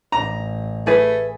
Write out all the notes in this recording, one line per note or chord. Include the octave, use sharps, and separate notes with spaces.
A1 A#5
A3 G#4 B4